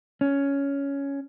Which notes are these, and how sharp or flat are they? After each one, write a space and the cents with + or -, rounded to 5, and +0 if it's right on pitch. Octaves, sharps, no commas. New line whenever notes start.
C#4 +10